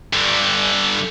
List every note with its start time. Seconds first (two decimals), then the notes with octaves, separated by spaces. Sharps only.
0.13 G2 D3